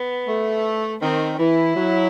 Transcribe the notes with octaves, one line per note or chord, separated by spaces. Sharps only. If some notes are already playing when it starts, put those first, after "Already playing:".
Already playing: B3
A3
D#3 C4
E3 E4
F#3